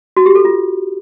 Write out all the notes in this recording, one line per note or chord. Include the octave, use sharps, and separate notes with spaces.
F#4
G4
A4
F4